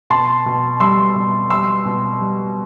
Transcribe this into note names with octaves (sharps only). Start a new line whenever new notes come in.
B2 A5 C6
B2
G3 C6 E6
B2
G3 C6 E6
B2
G3